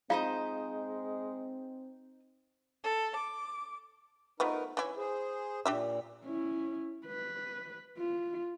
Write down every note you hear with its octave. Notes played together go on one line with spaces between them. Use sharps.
G#3 C4 D#4 F4 C5 F5 D#6
A4
D6
F3 A3 B3 D#4 A#4 B4
E3 C#4 E4
G#4 C5
A#2 D4 G4 E5
C#4 E4
B4
F4